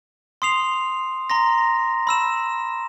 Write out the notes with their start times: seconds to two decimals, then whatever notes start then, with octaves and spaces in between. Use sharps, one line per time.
0.42 C6 D#6 C7 F7
1.30 A#5 C6 A#6
2.07 B5 E6 E7